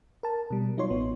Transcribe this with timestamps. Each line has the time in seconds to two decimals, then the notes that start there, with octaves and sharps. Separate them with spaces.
0.23 A#4 A5
0.50 B2 G3
0.77 F#3 D#4 F4 C#5 C6
0.90 A1 B3